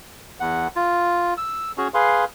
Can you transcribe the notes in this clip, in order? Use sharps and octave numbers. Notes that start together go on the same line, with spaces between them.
E2 F#5
F4
E6
C#4 F#4 G#4
G#4 B4 F5 C6